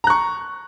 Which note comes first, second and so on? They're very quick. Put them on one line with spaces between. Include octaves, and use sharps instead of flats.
A#5 F#6 C#6